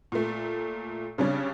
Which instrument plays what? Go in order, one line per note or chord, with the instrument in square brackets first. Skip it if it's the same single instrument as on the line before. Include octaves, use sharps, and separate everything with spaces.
[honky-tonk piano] A#2 A3
C#3 G3 C#4 D4